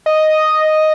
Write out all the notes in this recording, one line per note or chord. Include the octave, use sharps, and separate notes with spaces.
D#5